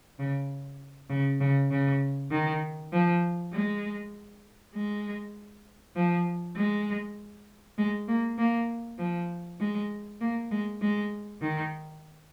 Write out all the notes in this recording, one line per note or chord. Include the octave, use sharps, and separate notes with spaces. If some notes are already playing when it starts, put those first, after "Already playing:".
C#3
C#3
C#3
C#3
D#3
F3
G#3
G#3
F3
G#3
G#3
A#3
A#3
F3
G#3
A#3
G#3
G#3
D#3